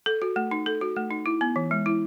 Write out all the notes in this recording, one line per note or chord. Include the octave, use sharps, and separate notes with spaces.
A4
F#4
A3
D#4
A4
F#4
A3
D#4
E4
B3
E3
G#3
E4